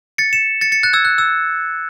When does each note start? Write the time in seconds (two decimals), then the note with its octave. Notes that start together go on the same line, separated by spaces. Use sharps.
0.18 A6 C#7
0.33 C#7 E7
0.61 A6 C#7
0.72 A6 C#7
0.83 F#6 A6
0.93 E6 G#6
1.05 F#6
1.18 E6